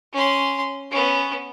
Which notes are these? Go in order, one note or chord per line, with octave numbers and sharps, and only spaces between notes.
C#4 C6
B3 C#4